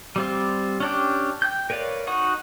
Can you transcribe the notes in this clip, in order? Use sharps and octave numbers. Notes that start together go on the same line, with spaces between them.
G3 C4 F4
C#4 D4 G4
G5 G6
A#4 B4 C#5 D5 F5
D#4 F#4 F#5 C#6